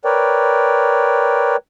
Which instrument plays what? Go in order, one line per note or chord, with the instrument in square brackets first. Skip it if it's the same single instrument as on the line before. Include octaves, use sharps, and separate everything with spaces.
[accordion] A#4 B4 C#5 D5 G5